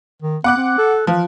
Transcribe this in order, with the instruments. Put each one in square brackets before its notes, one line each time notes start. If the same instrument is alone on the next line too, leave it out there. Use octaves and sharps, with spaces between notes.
[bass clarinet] D#3
[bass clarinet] B3 [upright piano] F#5 D6 F#6
[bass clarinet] C4
A4
[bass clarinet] E3 [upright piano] F3